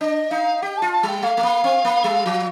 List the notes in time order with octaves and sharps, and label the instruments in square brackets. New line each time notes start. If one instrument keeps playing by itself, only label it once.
[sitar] D4 [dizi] D#5
[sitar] D#4 [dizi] F5
[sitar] G4 [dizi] G5
[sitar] F4 [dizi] A5
[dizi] A5
[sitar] G3 [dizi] G5
[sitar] A3 [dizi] F5
[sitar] A3
A#3
C4
A#3
G3
F3